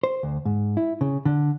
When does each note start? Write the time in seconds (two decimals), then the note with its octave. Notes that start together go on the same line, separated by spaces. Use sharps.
0.03 C5
0.23 D2
0.45 G#2
0.77 E4
1.01 C#3
1.26 D3